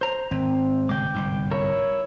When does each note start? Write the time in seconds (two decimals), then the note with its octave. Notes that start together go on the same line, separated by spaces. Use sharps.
0.01 C5 A#5
0.31 G#1 C4
0.89 G1 C3 G#3 G5 D6
1.14 G1 C2 G#2
1.51 E4 A#4 C#5